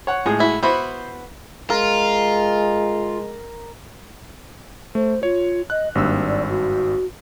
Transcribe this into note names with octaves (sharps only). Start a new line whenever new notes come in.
C#5 F#5
A2 G#3 G#4
E4 F#4
B3 E4 F#4 C5
G#3 F4 A#4
A3 C5
F4 C#5
D#5 F#6
G#1 G2 A#3 E6
D5
F#4